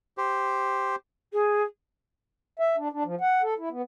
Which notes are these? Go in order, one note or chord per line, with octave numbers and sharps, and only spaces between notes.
G4 C5
G#4
E5
D4
D4
F3
F#5
A4
E4
B3